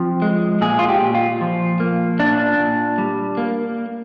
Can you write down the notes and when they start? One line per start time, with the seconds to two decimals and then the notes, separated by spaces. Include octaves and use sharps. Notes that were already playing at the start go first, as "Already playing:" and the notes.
Already playing: F3 C4
0.22 G#3
0.61 A#2 G#4
0.79 F4
0.89 G4
1.02 A#2
1.14 F4
1.41 F3
1.80 A#3
2.19 A#2 D4
2.59 A#2
2.98 G3
3.38 A#3